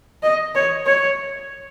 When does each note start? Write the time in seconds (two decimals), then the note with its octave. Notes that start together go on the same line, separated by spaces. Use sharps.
0.23 D#5
0.55 C#5
0.86 C#5